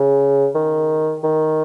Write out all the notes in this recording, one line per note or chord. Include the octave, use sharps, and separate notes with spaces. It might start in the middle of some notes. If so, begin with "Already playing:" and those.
Already playing: C#3
D#3
D#3